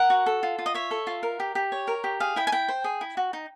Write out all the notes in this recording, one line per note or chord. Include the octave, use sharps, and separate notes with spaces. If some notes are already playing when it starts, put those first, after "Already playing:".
Already playing: A#4 F#5
F#4
A4
F4
F4
D#5
C#5 E5
A4
F4
A#4
G4
G4
C#5
A#4
G4
G#4 F5
E4 G5
G#5
E4 G5
C5
G#4
E4
F#4
D#4